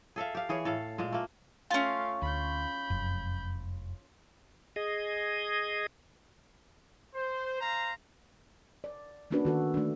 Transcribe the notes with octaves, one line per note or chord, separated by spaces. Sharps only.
G#4 A4 E5 F5
G4 F5
E3 G#4 C#5
A2 A4 F5
A#2 G#3
A3 A#3
A3 C#4 F4 F5
D2 B5 G6
F1 F#2
G#4 D#5
C5
C5 F5 A#5
D5
A3 A#3 C#4 D4 F#4 B4
D#3 F#4 A4
A3 D4